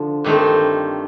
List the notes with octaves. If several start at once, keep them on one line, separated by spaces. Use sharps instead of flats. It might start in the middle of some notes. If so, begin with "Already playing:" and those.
Already playing: D3 F3
G2 D#3 A3 C4